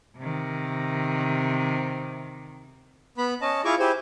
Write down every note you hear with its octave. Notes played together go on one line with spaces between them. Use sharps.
C3 D#3
B3 B5
C#4 D#5 A5
E4 F4 G#4 C#6 D6
E4 G4 G#4 C5